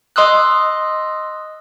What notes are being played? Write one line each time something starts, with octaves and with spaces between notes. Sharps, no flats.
D#5 C6 D#6 E6 F#6